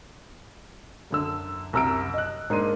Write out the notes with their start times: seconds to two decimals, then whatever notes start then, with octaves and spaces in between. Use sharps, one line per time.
1.11 F#2 D3 E6
1.73 C2 F#2 A#5 E6 F6 D7
2.14 D#5 F#6
2.50 G#2 A#3 D4 C6 D#7